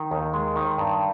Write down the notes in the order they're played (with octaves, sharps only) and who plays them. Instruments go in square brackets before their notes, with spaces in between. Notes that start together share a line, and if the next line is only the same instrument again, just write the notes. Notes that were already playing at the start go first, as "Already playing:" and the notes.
Already playing: [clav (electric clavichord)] D#3
D#2
G#3
D#3
G2